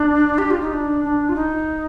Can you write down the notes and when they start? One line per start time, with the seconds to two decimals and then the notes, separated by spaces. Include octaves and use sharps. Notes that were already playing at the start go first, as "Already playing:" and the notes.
Already playing: D4
0.38 G4
0.51 F4
0.61 D#4
0.73 D4
1.05 D4
1.29 F4
1.36 D#4